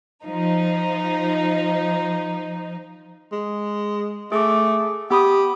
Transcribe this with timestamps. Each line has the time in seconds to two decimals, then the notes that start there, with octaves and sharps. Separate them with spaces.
0.25 F3 D#4
3.32 G#3
4.32 A3 G#4 D6
5.10 B3 G4 B5 D#6